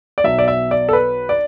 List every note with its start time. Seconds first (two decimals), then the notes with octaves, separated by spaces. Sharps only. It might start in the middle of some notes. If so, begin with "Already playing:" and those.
0.18 D5
0.24 B1 B2 F#3 E5
0.38 D5
0.48 E5
0.71 D5
0.89 A4
0.93 B4
1.29 D5